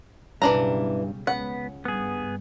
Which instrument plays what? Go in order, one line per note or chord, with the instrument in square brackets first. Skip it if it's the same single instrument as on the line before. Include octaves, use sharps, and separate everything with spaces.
[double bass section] B1 C#3 G3 [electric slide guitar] G2 [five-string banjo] E3 D4 A#5
[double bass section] C#2 C#3 [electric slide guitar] B3 [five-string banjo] F#5
[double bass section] G2 [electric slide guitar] B3 G#4